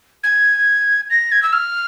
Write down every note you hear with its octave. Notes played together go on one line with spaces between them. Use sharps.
G#6
A#6
G#6
E6
F6